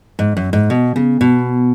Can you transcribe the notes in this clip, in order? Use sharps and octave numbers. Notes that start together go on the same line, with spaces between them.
G#2
F#2
G#2
B2
C#3
B2